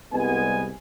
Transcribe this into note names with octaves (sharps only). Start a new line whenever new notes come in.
C2 G#3 B3 G#5